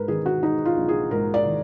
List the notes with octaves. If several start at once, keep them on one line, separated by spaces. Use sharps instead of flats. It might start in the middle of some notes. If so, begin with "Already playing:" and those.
Already playing: G#2 A#4 B4
D#3 G#4
F#4
G#3 D#4
F4
A#1
G#4
G#2 A#4
D5
D#3